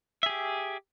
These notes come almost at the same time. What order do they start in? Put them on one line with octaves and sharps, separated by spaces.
E5 G#4 G4